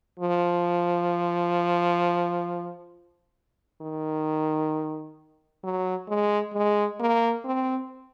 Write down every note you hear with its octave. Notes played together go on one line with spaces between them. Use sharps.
F3
D#3
F#3
G#3
G#3
A#3
C4